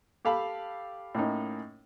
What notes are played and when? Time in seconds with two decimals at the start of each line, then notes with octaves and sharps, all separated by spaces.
0.25 G4 A4 F5 A5 B5
1.15 A2 A#3 C#4 D#4